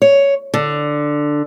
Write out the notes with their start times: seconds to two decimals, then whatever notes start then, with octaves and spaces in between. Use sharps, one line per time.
0.02 C#5
0.54 D3